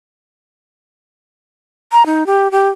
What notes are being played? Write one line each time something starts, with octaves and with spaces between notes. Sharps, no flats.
A#5
D#4
G4
G4